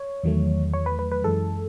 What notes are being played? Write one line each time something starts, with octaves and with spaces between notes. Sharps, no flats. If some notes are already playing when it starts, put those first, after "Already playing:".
Already playing: C#5
E2 D#3 F#3 A3
C#5
B4
B4
B4
F#2 E3 G#3 A4